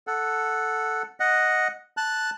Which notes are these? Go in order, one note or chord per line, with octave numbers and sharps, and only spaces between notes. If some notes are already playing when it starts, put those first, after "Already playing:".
A4 F#5
D#5 F#5
A5 F#6